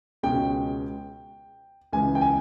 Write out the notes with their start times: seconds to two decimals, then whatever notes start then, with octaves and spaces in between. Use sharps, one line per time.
0.23 C#2 B2 G#3 C#4 G5
1.92 C#2 C#3 E3 G#5
2.15 G5
2.21 G#5